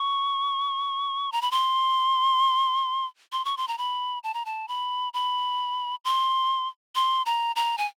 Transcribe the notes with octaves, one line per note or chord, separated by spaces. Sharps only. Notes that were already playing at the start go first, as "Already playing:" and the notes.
Already playing: C#6
A#5
B5
C6
C6
C#6
C6
A#5
B5
A5
A#5
A5
B5
B5
C6
C6
A#5
A#5
G#5